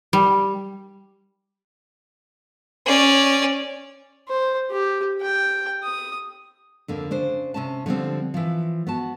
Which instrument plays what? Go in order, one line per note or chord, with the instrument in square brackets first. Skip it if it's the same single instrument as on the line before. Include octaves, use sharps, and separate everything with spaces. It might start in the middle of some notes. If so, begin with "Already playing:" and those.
[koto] G3
[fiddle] C#4 D5
[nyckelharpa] C5
G4
G5
D#6
[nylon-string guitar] F2 D3 A#3
C#3 D4 C5
C3 C#4 A5
D3 F3 G3 C4
E3 F3
B3 F#4 A5